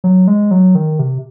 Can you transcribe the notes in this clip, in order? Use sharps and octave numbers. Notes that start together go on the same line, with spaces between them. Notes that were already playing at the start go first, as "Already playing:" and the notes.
F#3
G#3
F#3
D#3
C3